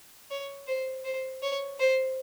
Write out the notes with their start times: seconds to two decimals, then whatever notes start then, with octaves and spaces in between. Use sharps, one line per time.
0.31 C#5
0.67 C5
1.05 C5
1.43 C#5
1.80 C5